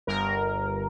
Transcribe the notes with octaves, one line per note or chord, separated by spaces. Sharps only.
G1 A#4